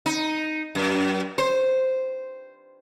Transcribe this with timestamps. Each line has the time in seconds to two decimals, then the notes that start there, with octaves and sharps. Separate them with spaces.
0.06 D#4
0.75 F#2
1.38 C5